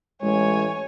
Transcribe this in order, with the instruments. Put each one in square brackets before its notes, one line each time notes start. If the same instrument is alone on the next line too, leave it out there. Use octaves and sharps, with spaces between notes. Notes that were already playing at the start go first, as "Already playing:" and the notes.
[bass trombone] A1 [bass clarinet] G#3 [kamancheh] C#5 G#5